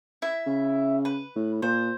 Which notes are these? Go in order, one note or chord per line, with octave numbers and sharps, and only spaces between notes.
E4 E5
C#3
B4
A2
A#2 C5